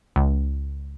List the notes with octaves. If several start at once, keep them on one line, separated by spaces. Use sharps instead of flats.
C#2